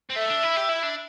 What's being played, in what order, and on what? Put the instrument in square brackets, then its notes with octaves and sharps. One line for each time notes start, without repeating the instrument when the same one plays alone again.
[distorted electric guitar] C4
[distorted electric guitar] A3 [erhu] E5
[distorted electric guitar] D4
E4
G4
E4
D4